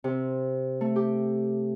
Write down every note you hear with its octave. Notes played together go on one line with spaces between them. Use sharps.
C3
A3
G4